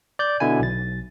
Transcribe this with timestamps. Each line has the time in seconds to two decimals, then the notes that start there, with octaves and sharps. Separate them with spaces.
0.19 D5 G6
0.40 B2 D3 E4 G#5
0.60 B1 A6